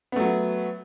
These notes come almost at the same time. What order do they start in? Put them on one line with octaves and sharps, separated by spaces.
B3 A3 F#3